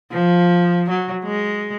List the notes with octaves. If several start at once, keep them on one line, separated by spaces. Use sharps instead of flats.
F3
F#3
G#3